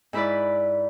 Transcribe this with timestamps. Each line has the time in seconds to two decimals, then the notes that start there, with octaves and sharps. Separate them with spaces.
0.13 G#2 E4 B4 D5